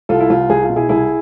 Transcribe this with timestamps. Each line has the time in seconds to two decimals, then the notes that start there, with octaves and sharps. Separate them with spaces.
0.09 C2 F4 A4
0.20 E4
0.30 C2 F4
0.50 C2 G#4
0.63 F4
0.69 B2
0.76 E4 G#4
0.89 C2 E4 G#4